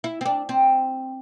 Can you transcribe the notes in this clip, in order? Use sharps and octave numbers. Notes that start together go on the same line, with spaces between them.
E4
C4
D4
C4